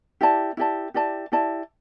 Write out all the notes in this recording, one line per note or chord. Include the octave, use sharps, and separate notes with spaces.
E4 G4 D5 A5
E4 G4 D5 A5
E4 G4 D5 A5
E4 G4 D5 A5